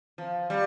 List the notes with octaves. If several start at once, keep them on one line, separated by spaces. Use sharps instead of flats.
F3
G3